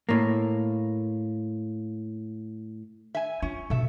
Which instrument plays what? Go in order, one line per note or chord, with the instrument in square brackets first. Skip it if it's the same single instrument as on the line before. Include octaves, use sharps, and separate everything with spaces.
[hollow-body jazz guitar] A2 A#3
[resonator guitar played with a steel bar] E5 G#5
[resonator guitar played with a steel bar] C#4 [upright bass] F4
[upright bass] B2 [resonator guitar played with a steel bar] A3 E5